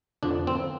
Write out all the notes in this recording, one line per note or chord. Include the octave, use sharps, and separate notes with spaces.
F2 D3 F3 D4
C4